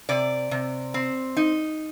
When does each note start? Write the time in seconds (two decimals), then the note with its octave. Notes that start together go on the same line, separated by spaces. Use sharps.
0.09 C3 D5
0.51 C3
0.94 C4
1.37 D#4